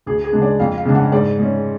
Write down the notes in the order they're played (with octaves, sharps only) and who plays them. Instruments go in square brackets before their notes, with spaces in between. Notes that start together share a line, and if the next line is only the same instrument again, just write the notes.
[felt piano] D2 G#4
G#4
C#3 G#3 D4
D5
F2 F5
F5
C#3 G#3 D4
F#5
G#2 D5
G#3 C#4